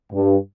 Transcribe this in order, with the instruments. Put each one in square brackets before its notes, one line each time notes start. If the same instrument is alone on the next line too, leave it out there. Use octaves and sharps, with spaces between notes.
[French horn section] G2